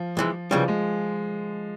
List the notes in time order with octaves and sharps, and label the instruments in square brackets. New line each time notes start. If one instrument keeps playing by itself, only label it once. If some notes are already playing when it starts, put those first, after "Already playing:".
Already playing: [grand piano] F3
[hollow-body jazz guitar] F2 E3 G#3
[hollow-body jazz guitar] C#2 C#3 E3 G3 [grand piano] F3
[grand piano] G#3